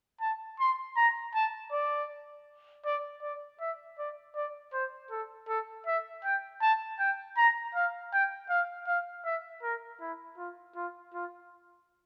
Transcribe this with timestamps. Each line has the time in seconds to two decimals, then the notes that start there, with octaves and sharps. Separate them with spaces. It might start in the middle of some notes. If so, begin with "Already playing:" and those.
0.21 A5
0.60 C6
0.96 A#5
1.35 A5
1.72 D5
2.85 D5
3.22 D5
3.60 E5
3.99 D5
4.36 D5
4.73 C5
5.11 A4
5.48 A4
5.86 E5
6.24 G5
6.62 A5
6.99 G5
7.37 A#5
7.75 F5
8.13 G5
8.49 F5
8.87 F5
9.25 E5
9.62 A#4
10.01 E4
10.38 F4
10.75 F4
11.14 F4